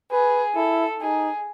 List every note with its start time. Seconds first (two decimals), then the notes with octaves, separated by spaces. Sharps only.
0.11 G#4 B4
0.56 E4 A4
1.00 D#4 G#4